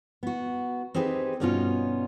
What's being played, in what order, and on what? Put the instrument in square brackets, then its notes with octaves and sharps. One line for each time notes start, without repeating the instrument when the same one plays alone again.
[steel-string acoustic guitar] B3 F#4
C4 D#4 G4 G#4 A#4 B4
G2 B2 B3 C#4 D#4 F4